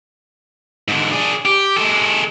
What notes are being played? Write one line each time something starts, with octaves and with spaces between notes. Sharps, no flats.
G#2 D3
D4 G#4
G4
G#3 A4